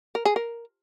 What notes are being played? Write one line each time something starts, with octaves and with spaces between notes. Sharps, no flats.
A#4
G#4
A#4